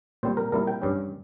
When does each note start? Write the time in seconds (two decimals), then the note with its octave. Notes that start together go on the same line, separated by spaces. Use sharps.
0.23 A#2 G3 C4 C5
0.37 A#4
0.52 A#2 G3 C4 E4 A#4
0.67 G5
0.82 G2 G3 C#4